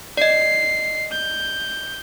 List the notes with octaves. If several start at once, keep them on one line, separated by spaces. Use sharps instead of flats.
D5 D#5 C7
G6